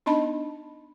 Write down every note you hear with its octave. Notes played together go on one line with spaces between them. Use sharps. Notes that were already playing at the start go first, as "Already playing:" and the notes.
B3 D4 D#4 D#5 A5 B5